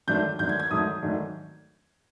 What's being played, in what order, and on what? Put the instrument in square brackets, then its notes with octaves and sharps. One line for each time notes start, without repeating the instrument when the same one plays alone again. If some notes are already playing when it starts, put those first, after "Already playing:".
[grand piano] G#2 D#3 F#3 A3 D4 G6
G#2 D#3 F#3 A3 D4 G6
G#6
G#6
G#2 D#3 F#3 A3 D4 D#6
G#2 D#3 F#3 A3 D4